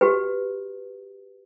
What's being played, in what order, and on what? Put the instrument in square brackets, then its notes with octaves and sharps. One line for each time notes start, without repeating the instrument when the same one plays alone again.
[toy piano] F#4 G4 B4